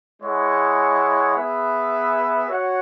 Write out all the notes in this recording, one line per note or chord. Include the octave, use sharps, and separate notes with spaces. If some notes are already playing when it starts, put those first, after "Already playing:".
G#3 E4 G#4 C#5 F#5
B3 G#4 B4 E5
F#4 C#5 F#5